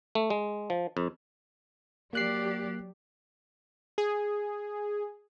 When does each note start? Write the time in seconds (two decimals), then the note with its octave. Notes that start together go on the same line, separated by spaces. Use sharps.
0.15 A3
0.30 G#3
0.70 F3
0.97 F2
2.13 F#3 A#3 G4 D5 F#6 C7
3.98 G#4